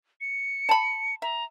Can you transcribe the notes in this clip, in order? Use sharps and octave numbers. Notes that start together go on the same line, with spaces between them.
C#7
A5 B5
E5 A#5